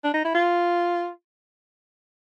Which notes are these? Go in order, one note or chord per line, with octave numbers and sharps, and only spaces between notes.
D4
D#4
E4
F4